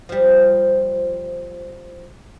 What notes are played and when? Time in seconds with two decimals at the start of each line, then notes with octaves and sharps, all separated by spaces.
0.09 F3 G3